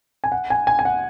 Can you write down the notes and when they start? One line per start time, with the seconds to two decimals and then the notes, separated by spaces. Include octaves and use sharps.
0.24 G#5
0.32 F#5
0.50 G#5
0.67 G#5
0.79 G#5
0.85 F#5